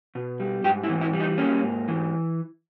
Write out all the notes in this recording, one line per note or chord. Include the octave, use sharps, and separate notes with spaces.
B2
G3
G#2 G4
E4
E3
E4
G3
D#4
A#3 C#4
G#2
E3